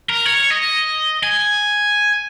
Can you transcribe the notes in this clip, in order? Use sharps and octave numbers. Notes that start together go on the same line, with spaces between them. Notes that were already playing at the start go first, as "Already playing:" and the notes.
A#4
C#5
D#5
G#5